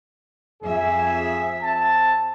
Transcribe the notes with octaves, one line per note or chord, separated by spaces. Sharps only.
F2 G#4 E5
C4 A5